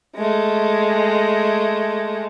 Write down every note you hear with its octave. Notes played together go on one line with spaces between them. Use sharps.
G#3 A3